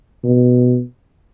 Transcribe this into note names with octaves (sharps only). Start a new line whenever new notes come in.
B2